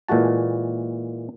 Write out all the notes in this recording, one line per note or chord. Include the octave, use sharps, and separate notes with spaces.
A#2 E3 G#3 F#4 A5